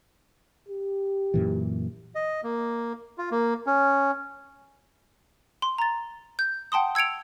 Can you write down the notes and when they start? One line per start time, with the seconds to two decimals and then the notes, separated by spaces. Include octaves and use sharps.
0.68 G4
1.34 F#2 A#2 E3
2.15 D#5
2.43 A#3
3.18 F4
3.31 A#3
3.66 C#4
5.62 C6
5.78 A#5 A6
6.39 G6
6.72 F#5 G5 A5 C6 D#6
6.95 E6 G#6 C#7 D7 F7